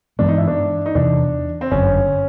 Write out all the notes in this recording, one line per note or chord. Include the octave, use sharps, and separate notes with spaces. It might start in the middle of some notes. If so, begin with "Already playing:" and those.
G2 E3 G#3 B3 D4
D#4
E4
D4
D#4
E2 C3 E3 D4
C4
G1 F#2 D3 C#4